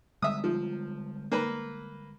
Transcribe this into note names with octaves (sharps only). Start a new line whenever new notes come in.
D3 G3 G#3 E5 D#6
F3
A#3 B4